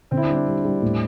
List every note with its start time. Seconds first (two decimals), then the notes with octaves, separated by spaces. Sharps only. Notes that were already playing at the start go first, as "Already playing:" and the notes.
0.11 D3 C4
0.17 E4
0.23 D4
0.29 G3
0.35 D4
0.46 G3
0.65 G3
0.82 A2